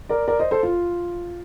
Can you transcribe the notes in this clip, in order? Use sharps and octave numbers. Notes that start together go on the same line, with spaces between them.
A#4 D5
A#4 D5
C5 D#5
A4 C5
F4